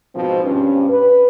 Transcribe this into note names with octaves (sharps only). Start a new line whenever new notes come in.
G#2 B2 F3 C4
G2 C#4
B4